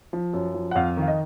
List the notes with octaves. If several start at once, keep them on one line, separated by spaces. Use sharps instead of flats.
F3
F#2
F3
F#5
F2 F5
D#3 F5
D#5